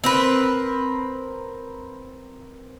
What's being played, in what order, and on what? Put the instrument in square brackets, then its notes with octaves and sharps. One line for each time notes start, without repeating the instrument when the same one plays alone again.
[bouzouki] C4 A#4 B4